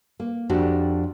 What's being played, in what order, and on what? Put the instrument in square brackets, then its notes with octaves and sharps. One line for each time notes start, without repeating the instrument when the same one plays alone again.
[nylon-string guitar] A#3
F2 D4 F#4 G4